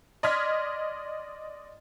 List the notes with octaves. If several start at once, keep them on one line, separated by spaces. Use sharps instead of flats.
D5 D#5 C6 F6 G#6 B6